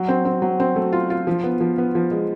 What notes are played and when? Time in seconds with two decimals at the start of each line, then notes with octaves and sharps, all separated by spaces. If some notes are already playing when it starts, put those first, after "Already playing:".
Already playing: F#3
0.08 C4
0.25 C4
0.42 F#3
0.60 C4
0.76 A3
0.93 F4
1.10 F4
1.27 F3
1.43 B3
1.60 F3
1.78 B3
1.95 F3
2.11 G#3